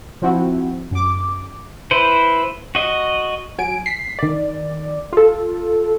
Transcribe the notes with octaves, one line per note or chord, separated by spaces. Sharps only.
F3 C4 E4 F#4
F#2 D6
E4 B4 C5
F#4 D#5
F#3 G#5 D7
B6 C7
D#3 D5
F4 A4